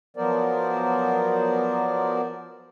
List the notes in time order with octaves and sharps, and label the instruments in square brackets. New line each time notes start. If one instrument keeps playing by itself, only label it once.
[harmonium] F3 F#3 B3 A#4 C5 D5